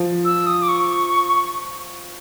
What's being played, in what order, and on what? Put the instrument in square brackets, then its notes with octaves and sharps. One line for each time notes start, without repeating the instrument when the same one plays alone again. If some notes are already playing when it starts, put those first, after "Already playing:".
Already playing: [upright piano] F3
[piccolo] E6
D#6
D6
C#6